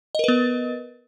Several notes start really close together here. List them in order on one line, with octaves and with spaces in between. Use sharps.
D#5 A#4 B4 B3